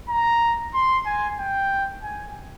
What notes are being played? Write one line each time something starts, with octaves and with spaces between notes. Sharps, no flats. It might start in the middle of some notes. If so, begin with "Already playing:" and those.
A#5
C6
G#5
G5
G#5